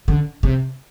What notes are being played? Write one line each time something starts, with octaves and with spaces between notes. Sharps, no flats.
D3
C3